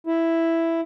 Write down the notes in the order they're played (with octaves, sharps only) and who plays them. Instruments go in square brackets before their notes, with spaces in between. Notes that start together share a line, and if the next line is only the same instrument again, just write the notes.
[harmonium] E4